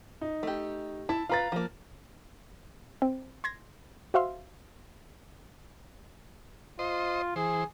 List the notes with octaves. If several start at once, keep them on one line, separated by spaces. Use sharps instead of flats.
D#4
A3 G4
E4 A5
F4 B4 F5 A#5 A6
F3 A#3
C4
C6 G#6 A#6
F#4 C5 E5 F5 C6
F4 C5 D#5
E3 G#4 C5